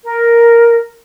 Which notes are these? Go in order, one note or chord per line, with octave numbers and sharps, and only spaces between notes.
A#4